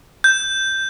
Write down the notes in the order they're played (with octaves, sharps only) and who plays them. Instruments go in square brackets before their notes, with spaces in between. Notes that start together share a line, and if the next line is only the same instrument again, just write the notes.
[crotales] G6